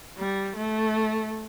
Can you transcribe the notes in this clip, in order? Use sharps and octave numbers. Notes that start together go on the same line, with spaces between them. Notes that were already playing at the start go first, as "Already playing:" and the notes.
G3
A3